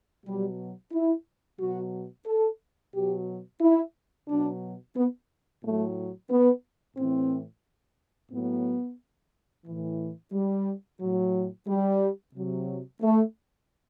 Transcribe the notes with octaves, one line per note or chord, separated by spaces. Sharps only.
B2 F#3 G3
E4
B2 F#3 F#4
A4
B2 F#3 G4
E4
B2 F#3 D4
B3
A2 F#3 A3
B3
A2 E3 C4
A2 F#3 B3
A2 E3
G3
A2 F#3
G3
C3 F#3
A3